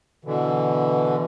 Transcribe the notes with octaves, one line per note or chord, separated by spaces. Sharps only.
B2 D3 E3